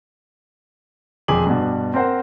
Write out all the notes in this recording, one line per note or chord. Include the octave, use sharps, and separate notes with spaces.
E1 F2 G#4 G#5 D6 F#7
G2 B2
C4 A#4 C5 F#5